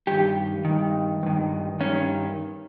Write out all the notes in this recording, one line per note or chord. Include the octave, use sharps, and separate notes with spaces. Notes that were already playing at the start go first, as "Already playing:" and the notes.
G2 D#3 G4
G2 D#3
G2 D#3
G2 D#3 C#4